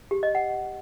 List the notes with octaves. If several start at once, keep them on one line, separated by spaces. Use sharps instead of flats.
G4
D#5
F#5